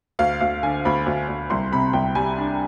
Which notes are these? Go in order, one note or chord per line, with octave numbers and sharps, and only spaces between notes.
D2 F5
D2 F5
D3 G#5
D2 B5
D2
D2
C2 C6
C3 B5
C2 G5
G3 G#5
D4